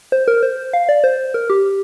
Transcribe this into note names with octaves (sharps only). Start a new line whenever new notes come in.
C5
A#4
C5
F5
D5
C5
A#4
G4